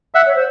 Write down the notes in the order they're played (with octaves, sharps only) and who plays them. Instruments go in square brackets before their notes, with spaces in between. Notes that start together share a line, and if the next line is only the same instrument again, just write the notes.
[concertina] E5 F#5
[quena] C#5
C5